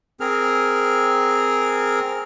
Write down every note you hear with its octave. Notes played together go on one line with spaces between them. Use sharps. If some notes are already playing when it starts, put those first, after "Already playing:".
C4 G#4 A#4 F6